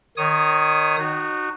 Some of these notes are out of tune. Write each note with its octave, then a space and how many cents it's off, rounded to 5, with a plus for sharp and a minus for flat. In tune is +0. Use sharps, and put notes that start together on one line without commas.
D#3 -20 C#5 +0 D#6 +0
D#4 -30 F#4 +0